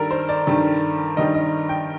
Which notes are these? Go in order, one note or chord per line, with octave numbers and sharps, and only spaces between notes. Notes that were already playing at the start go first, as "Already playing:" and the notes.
Already playing: G2 D#3 G3 A4 A#4
C5
D5
G2 D#3 G3
G2 D#3 G3 D#5
D#5
G5